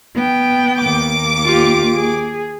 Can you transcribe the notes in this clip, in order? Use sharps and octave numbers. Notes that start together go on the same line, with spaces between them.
B3 G5
D#2 D6
F4 G4
G#4